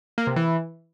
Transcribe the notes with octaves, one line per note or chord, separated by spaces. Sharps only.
A#3
C3
E3